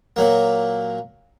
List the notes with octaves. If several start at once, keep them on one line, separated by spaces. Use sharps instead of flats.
A#2 F#3 A#3